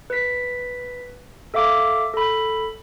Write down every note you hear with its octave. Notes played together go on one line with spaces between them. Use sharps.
B4 B6
A4 E5 F5 D6
A4 B5